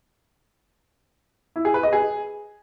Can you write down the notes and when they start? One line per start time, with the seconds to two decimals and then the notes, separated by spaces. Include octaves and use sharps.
1.56 E4
1.65 G#4
1.74 B4
1.83 D#5
1.93 G#4